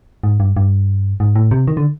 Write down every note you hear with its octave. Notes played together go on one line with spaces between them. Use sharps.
G#2
G2
G2
G#2
A2
C3
D#3
D3